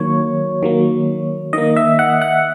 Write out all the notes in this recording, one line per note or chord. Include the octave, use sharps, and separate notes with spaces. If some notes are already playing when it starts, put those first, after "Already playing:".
Already playing: D#3 F#3 A#3 C#5
D#3 F#3 A#3
D#3 A#3 D#5
E5
F#5
F#5